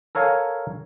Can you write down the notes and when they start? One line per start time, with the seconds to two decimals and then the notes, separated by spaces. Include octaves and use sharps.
0.15 A4 A#4 C#5 F5 G#5